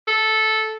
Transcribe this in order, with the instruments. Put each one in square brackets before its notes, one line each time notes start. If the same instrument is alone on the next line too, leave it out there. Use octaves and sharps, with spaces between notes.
[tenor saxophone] A4